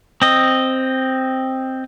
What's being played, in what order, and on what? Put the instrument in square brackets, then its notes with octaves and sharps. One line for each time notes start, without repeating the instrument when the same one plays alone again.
[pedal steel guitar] C4 D#5